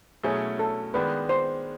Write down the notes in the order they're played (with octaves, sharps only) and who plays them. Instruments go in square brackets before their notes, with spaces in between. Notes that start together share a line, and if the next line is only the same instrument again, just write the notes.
[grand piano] B2 F#3 A3 C#4 E4 [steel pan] G#4
[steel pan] A4
[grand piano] D#3 G#3 B3 D4 [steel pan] B4
[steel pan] C5